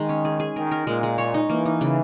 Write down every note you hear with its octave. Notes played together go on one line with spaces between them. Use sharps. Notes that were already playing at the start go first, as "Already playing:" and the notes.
Already playing: D#3 G#3 D#4
C#4
G#4
G#4
D#3 A#4
A#4
A#2 G#3
G#3
C#5
D#4
E3 A#3
D#4
C#3